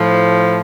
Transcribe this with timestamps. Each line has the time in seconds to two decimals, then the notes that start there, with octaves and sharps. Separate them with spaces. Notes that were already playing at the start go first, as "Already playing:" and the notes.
Already playing: A2 F3